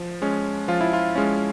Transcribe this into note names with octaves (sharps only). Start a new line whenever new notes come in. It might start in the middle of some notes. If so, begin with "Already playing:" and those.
Already playing: F3
G#3 C#4
F3 F4
E4
F4
G#3 C#4